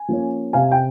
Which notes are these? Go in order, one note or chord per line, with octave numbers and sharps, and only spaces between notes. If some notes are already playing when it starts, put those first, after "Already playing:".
Already playing: G#5
F3 A#3 C#4
C3 F5 G#5
G5